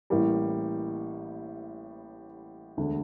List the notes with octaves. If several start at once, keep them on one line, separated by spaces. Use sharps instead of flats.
A1 A2 E3 G3 A#3
E1 D2 D3